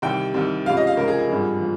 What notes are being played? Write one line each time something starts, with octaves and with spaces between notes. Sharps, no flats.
C2 C3 D#3 G5
C2 C3 D#3
C#2 C3 F3 F5
D#5
F5
C#2 C3 F3 A#4
G#4
G#4
G#1 G2 F3
F3